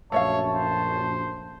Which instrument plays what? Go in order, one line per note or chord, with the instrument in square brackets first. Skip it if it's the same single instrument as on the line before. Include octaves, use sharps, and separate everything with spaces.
[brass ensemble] A#1 F#2 [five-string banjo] A3 E5 F5 [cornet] C#5 [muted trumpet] A5
[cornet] C5